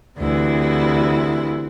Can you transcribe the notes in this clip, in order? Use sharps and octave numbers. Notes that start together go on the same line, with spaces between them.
D2 C3 E3 E4